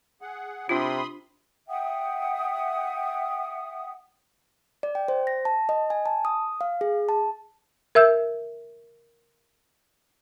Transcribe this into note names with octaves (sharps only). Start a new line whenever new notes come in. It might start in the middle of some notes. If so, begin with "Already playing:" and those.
G#4 F#5
C3 D4 F4 B5 C6 D#6
E5 F#5 G5 D#6
D5
G5
C5
A#6
A5
D#5
G#5
A5
D#6
F5
G#4
A5
A#4 E5 E6 G6